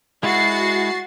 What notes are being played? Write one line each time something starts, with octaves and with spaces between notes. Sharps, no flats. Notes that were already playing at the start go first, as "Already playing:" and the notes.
G#3 E4 F#4 A6 C7